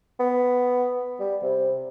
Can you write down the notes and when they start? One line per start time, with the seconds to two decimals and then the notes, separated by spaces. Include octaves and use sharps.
0.20 B3
1.20 G3
1.43 C3